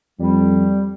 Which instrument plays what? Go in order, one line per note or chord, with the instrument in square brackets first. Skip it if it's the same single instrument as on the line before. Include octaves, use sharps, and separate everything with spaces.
[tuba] F2 [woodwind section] G3